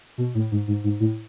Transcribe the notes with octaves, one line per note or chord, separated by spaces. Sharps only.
B2
A2
G#2
G#2
G#2
A2